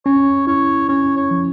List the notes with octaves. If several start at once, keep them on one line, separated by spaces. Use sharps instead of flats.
C#4 C#5
E4 C#5
C#4 C#5
C#5
F3